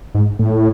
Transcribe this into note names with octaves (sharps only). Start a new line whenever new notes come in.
G#2
A2